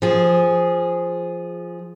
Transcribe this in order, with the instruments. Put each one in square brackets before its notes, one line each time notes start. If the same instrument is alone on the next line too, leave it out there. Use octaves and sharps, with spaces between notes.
[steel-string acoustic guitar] F3 G#4